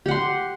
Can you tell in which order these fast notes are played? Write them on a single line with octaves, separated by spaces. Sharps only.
G4 F#5 C6